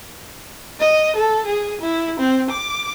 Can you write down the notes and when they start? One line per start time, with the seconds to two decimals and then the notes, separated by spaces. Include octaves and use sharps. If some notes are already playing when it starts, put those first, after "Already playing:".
0.80 D#5
1.16 A4
1.46 G#4
1.81 E4
2.20 C4
2.50 D6